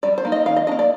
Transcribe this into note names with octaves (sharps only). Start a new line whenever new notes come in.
G3 D5
C5
A#3 D#4
D#5
D#3 F5
D#5
D4 D#5
A#3
D5